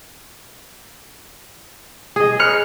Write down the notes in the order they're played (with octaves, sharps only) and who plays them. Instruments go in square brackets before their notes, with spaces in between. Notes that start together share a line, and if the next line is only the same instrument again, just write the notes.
[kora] G#4 D#5
[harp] F6 F#6 C#7